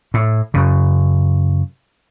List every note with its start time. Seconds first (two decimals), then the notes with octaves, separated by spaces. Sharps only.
0.14 A2
0.54 F#2 C#3